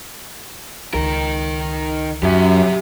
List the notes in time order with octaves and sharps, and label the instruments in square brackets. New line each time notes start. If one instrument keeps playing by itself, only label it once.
[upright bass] C#2 [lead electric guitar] D#3 A#4
[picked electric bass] F#2 [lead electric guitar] G4 E5